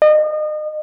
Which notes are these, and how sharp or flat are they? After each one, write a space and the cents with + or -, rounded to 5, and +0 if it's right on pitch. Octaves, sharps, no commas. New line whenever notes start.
D#5 -35